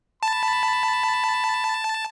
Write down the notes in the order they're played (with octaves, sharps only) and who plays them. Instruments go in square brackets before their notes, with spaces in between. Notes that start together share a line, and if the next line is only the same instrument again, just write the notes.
[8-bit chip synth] A5 [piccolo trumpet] B5